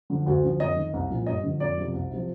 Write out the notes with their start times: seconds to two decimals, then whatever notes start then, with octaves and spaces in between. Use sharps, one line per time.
0.10 D3 F3
0.26 D2
0.43 D3 F3
0.59 F2 D#5
0.76 D#3
0.93 C2
1.10 A#2 F3
1.26 G2 D#5
1.43 D3 F3
1.60 F2 D5
1.77 C3 F3
1.93 C2
2.10 C3
2.15 F3